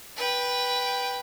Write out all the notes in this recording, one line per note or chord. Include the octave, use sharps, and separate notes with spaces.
B4 G5